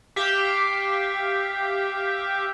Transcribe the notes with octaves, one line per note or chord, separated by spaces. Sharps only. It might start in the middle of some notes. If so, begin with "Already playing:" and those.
G4 E5 F5 G5